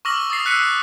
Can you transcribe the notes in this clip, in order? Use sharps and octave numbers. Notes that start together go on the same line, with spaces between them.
C#6 D6 E6 F6 A#6 F#7
D#6 A6 C7
E6 F#6 B6 C#7 D#7